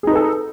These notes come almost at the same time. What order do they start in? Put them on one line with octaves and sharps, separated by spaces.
G#4 D#4 B4 A4